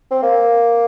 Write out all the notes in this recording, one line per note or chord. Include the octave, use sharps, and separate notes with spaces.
C4
A#3